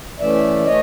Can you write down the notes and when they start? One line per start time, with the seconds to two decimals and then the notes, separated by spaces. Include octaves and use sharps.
0.19 E3 A3 C#4 D5 E5
0.61 E5
0.66 A3 C#5 D#5